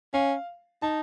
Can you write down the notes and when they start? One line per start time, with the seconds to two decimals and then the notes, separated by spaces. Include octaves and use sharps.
0.14 C#4 F5
0.82 D#4 A5